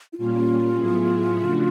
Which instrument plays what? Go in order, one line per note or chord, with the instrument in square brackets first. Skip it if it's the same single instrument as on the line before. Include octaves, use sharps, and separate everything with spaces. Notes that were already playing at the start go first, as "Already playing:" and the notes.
[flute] E4
[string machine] A#2 G3 A#3 C#4 [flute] F4
[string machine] A2 F#3 B3 E4 G#4
C#3 F3 A3 D4 F#4